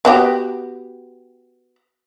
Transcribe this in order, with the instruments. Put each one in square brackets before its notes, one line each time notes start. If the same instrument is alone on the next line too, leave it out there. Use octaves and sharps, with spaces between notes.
[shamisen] B3 F#4 G4